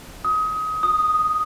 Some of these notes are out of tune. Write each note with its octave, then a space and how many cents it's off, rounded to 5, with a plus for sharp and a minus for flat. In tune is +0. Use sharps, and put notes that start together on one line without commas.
D#6 +25
D#6 +0